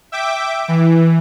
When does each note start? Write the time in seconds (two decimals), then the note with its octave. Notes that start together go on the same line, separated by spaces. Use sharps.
0.12 E5 G5 D6
0.68 E3